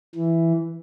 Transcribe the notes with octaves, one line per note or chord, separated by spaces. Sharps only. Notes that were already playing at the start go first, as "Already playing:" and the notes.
E3